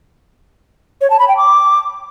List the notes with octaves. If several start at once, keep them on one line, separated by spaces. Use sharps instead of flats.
C#5
A5
B5
G5
D6